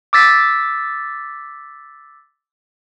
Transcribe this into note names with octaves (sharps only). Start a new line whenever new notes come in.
D6 E6 A6 B6